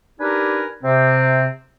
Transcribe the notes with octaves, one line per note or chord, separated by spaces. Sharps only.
D4 D#4 G4 A#4 B4 G#5
C3 C4